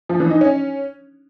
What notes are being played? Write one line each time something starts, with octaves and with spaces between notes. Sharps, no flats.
F3
E3
D#4
C#4